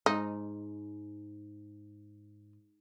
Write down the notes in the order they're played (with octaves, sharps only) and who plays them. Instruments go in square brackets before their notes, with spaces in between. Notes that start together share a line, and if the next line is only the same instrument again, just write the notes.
[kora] G#2 [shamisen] D#4